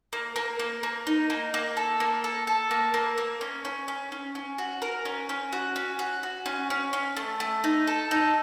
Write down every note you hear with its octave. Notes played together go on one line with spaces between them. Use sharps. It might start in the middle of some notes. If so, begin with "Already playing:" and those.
A#3
A#3
A#3
A#3
D#4
A#3
A#3
A4
A#3
A4
A4
A#3
A#3
A#3
C#4
C#4
C#4
C#4
C#4
F#4
A#4
C#4
C#4
F#4
C#4
F#4
F#4
C#4
C#4
C#4
A3
A3
D#4
A4
D#4